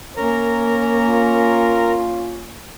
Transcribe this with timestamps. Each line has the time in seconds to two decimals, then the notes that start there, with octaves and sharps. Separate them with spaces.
0.17 A#3 C#4 A#4 A#5
1.05 F4